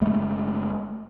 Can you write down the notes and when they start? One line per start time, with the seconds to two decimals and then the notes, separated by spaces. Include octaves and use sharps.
0.01 F#1 G#3 A3